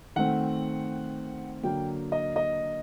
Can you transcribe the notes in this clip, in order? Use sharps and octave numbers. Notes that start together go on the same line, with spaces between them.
D#3 A3 C4 F#5
D3 F#3 A#3 G5
D#5
D#5